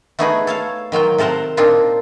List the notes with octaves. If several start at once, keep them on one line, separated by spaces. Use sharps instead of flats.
A3 B3 D#4 F#4 G#4 B4
A4 C#5 F5
D#3 F#3 F4 G5
C3 A4 A#4 C5 F#5
A#2 A#3 C4 D4 D#4 F4